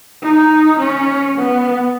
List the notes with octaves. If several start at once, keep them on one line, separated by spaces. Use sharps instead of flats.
D#4
C#4
B3